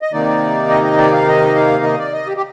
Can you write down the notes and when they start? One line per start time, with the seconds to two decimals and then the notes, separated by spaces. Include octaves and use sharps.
0.02 D#5
0.12 C3 D#3 A#3 D#4 D5
0.70 D#5
0.84 D#5
0.98 D5
1.13 F5
1.27 D#5
1.55 F5
1.84 D#5
1.98 D5
2.13 D#5
2.27 G4
2.37 G4